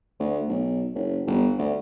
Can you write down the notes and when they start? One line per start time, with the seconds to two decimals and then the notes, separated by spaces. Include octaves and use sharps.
0.20 D2
0.48 B1
0.95 F#1
1.27 G1
1.58 D2